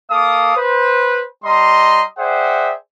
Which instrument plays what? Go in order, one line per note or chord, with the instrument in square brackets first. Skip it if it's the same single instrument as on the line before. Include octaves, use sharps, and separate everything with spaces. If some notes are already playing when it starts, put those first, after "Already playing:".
[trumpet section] A#3 A4 F5 D6 D#6
B4 C5
G3 D#5 A#5 C6
G#4 C5 D5 E5 F#5 G5